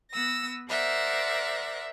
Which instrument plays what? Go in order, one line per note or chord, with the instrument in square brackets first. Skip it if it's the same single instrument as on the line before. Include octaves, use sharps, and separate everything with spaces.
[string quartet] B3 E6 A#6
A#4 C5 D5 E5 F#5